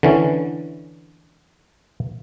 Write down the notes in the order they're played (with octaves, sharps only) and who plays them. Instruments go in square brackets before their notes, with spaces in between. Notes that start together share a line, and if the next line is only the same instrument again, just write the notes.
[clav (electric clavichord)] D3 E3 C#4